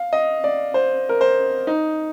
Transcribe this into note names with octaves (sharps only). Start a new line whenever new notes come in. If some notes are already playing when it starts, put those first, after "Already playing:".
Already playing: F5
D#5
D5
C5
A#4
C5
D#4